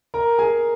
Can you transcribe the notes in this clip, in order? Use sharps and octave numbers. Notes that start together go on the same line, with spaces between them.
A#4 A#5
G#4 G#5